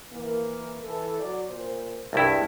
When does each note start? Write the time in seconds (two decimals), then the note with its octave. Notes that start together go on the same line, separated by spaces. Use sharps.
0.12 E3 A#3
0.84 E3 A4
1.19 F#3 D5
1.49 A#2 C5
2.13 C2 G2 D4 E4 G#4